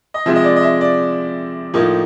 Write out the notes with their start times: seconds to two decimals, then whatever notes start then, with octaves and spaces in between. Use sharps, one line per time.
0.14 D#5
0.26 C3 F3 G#3 C4 E5
0.36 D#5
0.44 D5
0.56 D#5
0.63 E5
0.81 D5
1.74 A2 F3 A#3 D#4